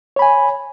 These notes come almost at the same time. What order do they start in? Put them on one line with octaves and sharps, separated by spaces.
C#5 B5 G#5